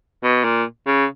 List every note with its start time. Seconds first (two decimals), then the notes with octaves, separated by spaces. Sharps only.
0.23 B2
0.45 A#2
0.87 C#3